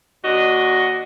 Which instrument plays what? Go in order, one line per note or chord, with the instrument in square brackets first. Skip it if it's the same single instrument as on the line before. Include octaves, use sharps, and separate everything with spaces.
[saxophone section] D#2 D4 F#4 D#5